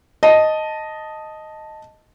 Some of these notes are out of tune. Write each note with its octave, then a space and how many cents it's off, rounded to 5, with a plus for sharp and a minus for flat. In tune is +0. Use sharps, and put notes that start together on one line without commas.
D#5 +0 A5 +0